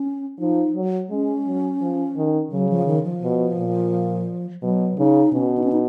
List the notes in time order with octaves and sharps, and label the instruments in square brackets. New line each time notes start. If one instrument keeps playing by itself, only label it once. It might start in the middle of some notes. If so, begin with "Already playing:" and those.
Already playing: [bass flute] C#4
[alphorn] F3 [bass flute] D#4
[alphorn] F#3
[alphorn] G#3 [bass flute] C#4
[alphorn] F#3
F3
D#3
[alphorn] C#3 [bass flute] F#3
[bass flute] F3
D#3
F3
[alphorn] B2
A#2
[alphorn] B2 [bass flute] F#3
[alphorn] C#3 [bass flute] D#4
[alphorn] B2 [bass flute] C#4
[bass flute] D#4
C#4
D#4